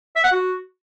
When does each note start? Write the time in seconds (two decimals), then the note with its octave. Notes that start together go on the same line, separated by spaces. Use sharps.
0.16 E5
0.24 F#5
0.32 F#4